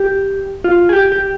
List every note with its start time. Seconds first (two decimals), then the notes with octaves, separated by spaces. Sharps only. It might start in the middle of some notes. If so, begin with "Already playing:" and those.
Already playing: G4
0.64 F4
0.89 G#4
0.93 G4
1.12 G4